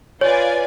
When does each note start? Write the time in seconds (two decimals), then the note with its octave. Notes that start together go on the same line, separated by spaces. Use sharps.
0.21 F4 B4 C#5 D5 G#5